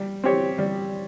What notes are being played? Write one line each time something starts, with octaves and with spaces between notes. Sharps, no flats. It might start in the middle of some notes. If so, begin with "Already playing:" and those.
Already playing: G3
C4 G4 C#5
G3